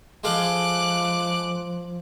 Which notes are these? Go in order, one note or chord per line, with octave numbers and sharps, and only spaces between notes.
F3 G#3 A4 F5 D6 F#6